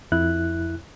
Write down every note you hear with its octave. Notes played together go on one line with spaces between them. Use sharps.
F2 E4 F#6